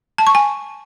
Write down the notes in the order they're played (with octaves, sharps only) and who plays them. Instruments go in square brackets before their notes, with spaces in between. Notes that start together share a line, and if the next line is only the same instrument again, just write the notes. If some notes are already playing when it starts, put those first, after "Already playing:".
[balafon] A5
C#6
G#5